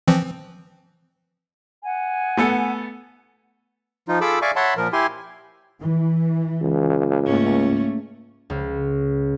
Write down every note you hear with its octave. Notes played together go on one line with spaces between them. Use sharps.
E3 F3 C4
F#5 G#5
A3 B3 A4
F3 D#4 F4
F4 G#4 A4 B5 D6 E6
D5 E5 F5 G#5 C#6 D6
C#5 E5 F#5 A5 B5 C6
A#2 F3 A#4
E4 G4 G#5 C6
E3
C#2
G#2 A3 A#3 C#4
C#2